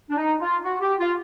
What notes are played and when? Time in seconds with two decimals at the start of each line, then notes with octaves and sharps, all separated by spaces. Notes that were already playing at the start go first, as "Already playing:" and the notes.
0.10 D4
0.17 D#4
0.40 F4
0.64 F#4
0.81 G4
0.99 F4